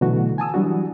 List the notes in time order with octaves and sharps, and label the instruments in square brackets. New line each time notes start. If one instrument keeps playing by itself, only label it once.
[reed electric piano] B2 D3 E3 F#3 A3 F#4
G#5 A5 D#6 E6
E3 F#3 G3 D4 F#4